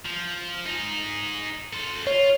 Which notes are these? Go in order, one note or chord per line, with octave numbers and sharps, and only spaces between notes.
F3
D#4 G#4
A4 C5
F4 C#5